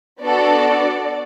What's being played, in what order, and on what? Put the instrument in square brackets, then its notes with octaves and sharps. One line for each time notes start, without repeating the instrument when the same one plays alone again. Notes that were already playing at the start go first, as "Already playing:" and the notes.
[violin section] B3 D4 F#4 A4 D5